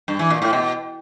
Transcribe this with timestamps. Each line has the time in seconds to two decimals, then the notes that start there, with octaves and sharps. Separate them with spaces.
0.08 G2
0.19 E3
0.30 A#2
0.42 A2
0.53 B2